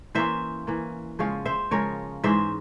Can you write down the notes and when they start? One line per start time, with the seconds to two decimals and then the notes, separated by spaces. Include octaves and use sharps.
0.15 E3 A#3 C#4 C5 E5
0.67 E3 A#3 C#4
1.19 C#3 F3 G#3 C#4 C#5 F5
1.45 C5 E5
1.71 C#3 F3 G#3 C#4 A#4 C#5
2.24 G#2 E3 G#3 C#4 C5 E5